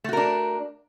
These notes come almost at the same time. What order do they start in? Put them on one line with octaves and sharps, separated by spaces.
A3 F#4 A#4 D4